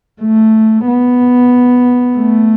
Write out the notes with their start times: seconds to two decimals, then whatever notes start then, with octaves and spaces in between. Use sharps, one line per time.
0.22 A3
0.87 B3
2.17 A3